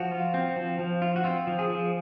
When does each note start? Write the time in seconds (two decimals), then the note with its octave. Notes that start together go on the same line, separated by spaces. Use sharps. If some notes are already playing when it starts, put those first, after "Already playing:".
Already playing: F3 F#4
0.11 F4
0.34 C4
0.56 F3
0.79 F3
1.02 F4
1.16 F#4
1.24 C4 F4
1.47 F3
1.59 G#4
1.70 F3